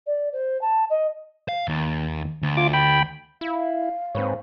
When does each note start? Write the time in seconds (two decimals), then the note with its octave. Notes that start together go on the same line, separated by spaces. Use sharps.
0.06 D5
0.33 C5
0.61 A5
0.90 D#5
1.48 F5
1.68 D#2
2.43 D2
2.57 F4 D6
2.73 G5 B5
3.41 E4 F5
4.15 G#2 C4 B4 C#5